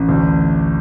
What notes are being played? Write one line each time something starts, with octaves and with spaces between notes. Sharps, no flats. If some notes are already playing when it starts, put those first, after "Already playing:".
Already playing: A1
D2